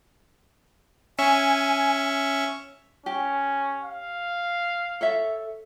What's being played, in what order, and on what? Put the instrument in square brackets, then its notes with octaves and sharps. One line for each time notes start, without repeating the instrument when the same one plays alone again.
[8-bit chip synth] C#4 E5 C#6 [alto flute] G#5
[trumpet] C#4 [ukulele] G4
[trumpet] F5
[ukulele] A4 C#5 E5